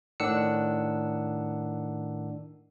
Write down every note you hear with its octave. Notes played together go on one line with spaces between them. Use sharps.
A2 D#3 D4 F#5 E6 C#7